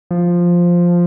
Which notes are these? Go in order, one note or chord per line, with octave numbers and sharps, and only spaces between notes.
F3